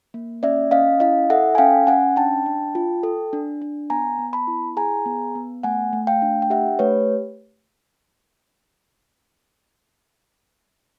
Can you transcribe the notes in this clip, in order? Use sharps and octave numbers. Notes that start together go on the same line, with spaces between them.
A#3
C#4 D5 E5
C#4 D#5 F5
E4 D#5 F5
A4 E5 F#5
G#5
C#4 F5 G5
C#4 F#5 G#5
D4 G5 A5
D4
F4
A4
D4
D4
B3 G#5 A#5
B3
A5 B5
E4
G#4 G#5 A#5
B3
B3
A3 F#5 G#5
A3
F5 G5
D4
G5
G4 E5 F#5
A3 B4 C#5